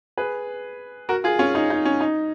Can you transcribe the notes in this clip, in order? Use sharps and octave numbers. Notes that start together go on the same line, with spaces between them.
G#4 B4
F#4 A#4
F4 G#4
C#4 F4
D#4
D#4
C#4
D#4